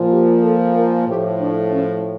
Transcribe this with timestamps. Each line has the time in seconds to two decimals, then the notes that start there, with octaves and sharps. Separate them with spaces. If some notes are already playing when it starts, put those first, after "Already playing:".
Already playing: A#2 F3
0.11 G4
0.42 A4
0.74 A#4
1.07 A2 F3 G4
1.39 D4
1.71 C#4